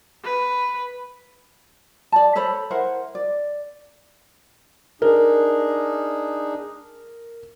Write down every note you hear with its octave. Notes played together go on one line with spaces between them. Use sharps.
B4
D5 A5
A4 C5 C#5 B5
E4 A#4 C5 F#5
D5
D4 D#4 G#4 A#4